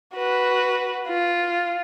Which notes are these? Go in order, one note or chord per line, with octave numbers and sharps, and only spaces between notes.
F#4 B4
F4